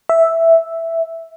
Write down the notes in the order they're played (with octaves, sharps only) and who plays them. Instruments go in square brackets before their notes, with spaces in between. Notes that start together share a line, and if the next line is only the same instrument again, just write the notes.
[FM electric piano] E5